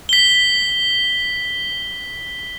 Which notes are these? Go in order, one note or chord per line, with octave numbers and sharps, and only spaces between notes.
B6 G7